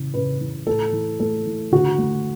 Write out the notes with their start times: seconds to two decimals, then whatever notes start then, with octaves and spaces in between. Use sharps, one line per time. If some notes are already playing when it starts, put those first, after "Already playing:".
Already playing: C#3 E3
0.14 C#3 B4
0.41 E3
0.67 A2 A4
0.93 E3
1.20 A3 A4
1.46 E3
1.72 D3 F#4
1.99 A3